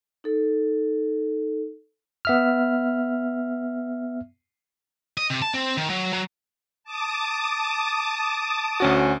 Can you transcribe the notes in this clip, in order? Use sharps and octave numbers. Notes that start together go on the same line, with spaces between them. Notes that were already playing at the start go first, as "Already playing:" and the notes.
D#4 A4
B3 E5 F6
D#5
C3
A5
C4
D#3
F#3
F#3
A5 D6 D#6
D2 C#4 F#4